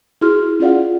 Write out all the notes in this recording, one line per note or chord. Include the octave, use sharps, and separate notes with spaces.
E4 F#4 G#4 C6 F6
C#4 F4 G#4 D5 F5 F#5